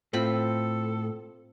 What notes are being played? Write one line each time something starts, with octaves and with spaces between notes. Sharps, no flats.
A2 C4 F4 A4 B5